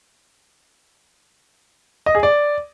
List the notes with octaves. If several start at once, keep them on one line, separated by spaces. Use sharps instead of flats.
D#5
G#4
D5